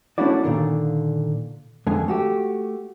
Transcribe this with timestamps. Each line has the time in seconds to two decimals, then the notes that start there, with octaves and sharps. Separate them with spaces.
0.18 A3 C#4 D4 E4 F#4 D5
0.44 A#2 D3 D#3 D4
1.87 F2 D3 G#3 G#5
2.08 A3 F#4 G4